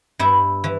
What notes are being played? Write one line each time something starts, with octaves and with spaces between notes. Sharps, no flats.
G2 E4
E3